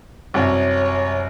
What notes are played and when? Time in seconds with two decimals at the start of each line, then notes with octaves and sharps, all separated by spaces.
0.34 C2 F#2 C#5 F#5 A5